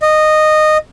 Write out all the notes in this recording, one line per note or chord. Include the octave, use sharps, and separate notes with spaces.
D#5